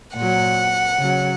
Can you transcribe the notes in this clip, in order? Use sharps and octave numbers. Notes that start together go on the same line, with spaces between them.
A#2 F#3 F#5
C#3 F#3